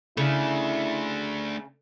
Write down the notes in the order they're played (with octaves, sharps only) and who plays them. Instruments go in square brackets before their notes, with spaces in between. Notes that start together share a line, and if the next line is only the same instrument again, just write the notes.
[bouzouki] C#3 [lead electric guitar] A3 D4 [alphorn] E4